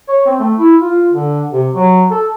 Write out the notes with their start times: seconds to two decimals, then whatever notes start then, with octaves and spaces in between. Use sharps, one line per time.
0.08 C#5
0.26 C4
0.40 A3
0.58 E4
0.81 F4
1.12 D3
1.52 C3
1.75 F#3
2.11 A4